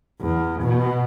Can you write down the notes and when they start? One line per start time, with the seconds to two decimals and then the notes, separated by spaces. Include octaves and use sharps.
0.21 E2
0.62 B2